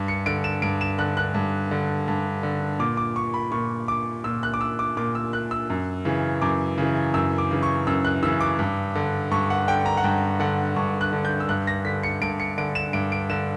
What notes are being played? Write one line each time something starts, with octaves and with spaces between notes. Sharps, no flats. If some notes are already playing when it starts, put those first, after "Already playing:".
Already playing: G2
C#7
D3 D7
E7
G2 D7
E7
D3 F#6
F#6
G2
D3
G2
D3
A#2 D6
D6
C#6
B5
A#2 C#6
D6
A#2 E6
F#6
D6
E6
D6
A#2 D6
E6
F#6
E6
F#2
C#3 E3
F#2 D6
C#3 E3
F#2 E6
D6
C#3 E3
C#6
F#2 E6
F#6
C#3 E3 E6
D6
G2
D3
G2 C#6
F#5
D3 G5
A#5
F#5
G2 G5
D3 F#5
G2 C#6
F#6
D3
G6
E6
G2 F#6
A#6
D3 B6
C#7
G2 D7
C#7
D3 D7
E7
G2 D7
D7
D3 E7